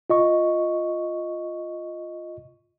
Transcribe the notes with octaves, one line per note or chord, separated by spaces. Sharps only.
F4 D#5 C#6